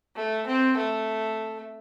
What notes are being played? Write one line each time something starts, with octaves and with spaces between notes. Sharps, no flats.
A3
C4
A3